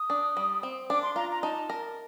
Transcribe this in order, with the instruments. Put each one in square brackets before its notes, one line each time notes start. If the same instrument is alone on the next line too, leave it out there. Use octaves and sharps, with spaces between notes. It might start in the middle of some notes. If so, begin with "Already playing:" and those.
Already playing: [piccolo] D#6
[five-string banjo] D4
G3
C4
[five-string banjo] D4 [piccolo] D6
[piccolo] C6
[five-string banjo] F4 [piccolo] A#5
[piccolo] A#5
[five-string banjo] D#4 [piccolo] A5
[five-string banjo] A#4